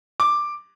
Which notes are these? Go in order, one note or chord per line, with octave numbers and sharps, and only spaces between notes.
D6